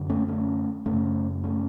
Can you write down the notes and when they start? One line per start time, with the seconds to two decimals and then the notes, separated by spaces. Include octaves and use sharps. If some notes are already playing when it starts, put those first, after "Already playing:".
Already playing: F#2 D3
0.10 A3 C#4
0.28 A3 C#4
0.86 F#2 C#3 A3 C#4
1.44 A3 C#4